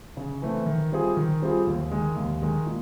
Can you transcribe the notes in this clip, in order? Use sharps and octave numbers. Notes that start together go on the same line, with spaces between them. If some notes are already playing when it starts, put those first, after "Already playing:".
C#3
E3 A3 C4
D#3
G3 C4 F4 G#4
D#3
G3 C4 F4 G#4
D#2
D#3 G#3
D#2
D#3 G#3
A#2